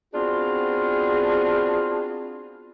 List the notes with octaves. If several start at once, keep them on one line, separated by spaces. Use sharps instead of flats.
B3 C4 D4 F4 F#4 G#4